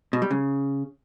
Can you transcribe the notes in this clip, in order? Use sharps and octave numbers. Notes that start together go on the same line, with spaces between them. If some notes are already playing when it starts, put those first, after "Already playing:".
B2
G3
C#3